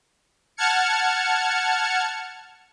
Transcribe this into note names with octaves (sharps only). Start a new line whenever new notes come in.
F#5 A5 F6 G#6 C#7